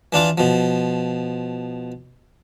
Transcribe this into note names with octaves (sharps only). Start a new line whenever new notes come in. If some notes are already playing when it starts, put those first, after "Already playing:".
E3 D4 F4 D6
B2 F3